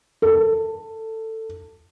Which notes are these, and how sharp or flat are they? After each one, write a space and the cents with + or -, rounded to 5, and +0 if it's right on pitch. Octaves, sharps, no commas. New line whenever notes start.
A4 +15